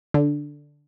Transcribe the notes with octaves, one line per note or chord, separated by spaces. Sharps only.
D3